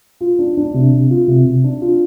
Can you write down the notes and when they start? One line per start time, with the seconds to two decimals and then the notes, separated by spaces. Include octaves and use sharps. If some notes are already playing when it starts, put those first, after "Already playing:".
0.21 F4
0.39 D4
0.57 D4
0.74 C3
0.92 C3
1.10 F4
1.27 C3
1.45 C3
1.64 D4
1.82 F4